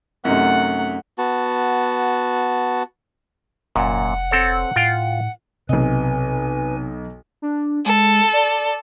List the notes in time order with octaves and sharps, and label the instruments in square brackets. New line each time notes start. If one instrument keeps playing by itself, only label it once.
[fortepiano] F#2 C3 D#4 [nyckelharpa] A3 F#5
[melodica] B3 F#4 A5
[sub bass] F1 [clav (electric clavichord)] F#2 A#2 [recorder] F#5
[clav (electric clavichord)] C4 A4 C#5
[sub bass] A2 [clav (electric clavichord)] F4 F5 G5
[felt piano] B1 D#5 [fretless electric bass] C3 [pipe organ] B4 G#5
[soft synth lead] D4
[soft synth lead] G#3 [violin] A4
[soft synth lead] D5